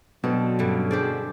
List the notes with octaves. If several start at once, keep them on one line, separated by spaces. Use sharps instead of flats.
B2 F#3 C4 D4 A4
D2 G2 D3 G3 C#4
D4 G4 G#4 C5 D5